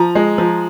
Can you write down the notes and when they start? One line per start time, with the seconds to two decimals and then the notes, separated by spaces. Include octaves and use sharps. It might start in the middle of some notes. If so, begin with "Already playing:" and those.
Already playing: F3 A#5
0.15 G#3
0.38 F3